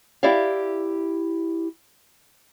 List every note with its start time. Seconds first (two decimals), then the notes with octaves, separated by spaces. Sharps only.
0.23 E4 G4 D5 E5 F5